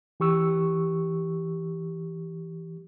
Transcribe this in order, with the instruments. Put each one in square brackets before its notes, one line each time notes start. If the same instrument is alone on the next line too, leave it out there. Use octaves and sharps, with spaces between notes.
[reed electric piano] E3 G4 C#6 E6